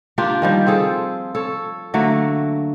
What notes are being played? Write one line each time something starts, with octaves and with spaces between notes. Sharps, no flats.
A#3 D4 F4 G4
D#3 F3 G3
C4 F4 G#4 A4
A4 C#5
D3 F#3 A3 A#3